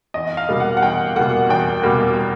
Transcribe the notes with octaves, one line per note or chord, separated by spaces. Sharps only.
E2 D#5
F5
B2 G3 A#3
F#5
F#5
E2 G5
B2 G3 A#3 F#5
E2 G5
B2 G3 A#3